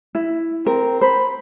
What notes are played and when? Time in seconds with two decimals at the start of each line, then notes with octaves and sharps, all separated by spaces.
0.15 E4
0.66 C4 A#4
1.01 C5 B5